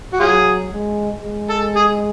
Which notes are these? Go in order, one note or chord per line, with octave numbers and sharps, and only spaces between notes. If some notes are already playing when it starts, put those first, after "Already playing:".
F#4
F#3 F4 G#4
G#3
G#3
A4
G#4